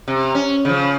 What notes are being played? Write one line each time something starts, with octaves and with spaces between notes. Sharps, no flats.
C3
C#4
C#3 F3